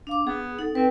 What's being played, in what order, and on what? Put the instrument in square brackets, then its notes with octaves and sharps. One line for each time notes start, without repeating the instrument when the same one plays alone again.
[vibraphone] D4 F5 D6
[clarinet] B3 [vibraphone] G#4
[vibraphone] D#4 A4
[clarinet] C4 [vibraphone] B4